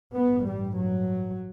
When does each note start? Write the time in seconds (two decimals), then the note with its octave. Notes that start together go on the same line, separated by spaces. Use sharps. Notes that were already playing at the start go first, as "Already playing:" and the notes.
0.15 A1 G2 B3
0.47 G3
0.79 F#3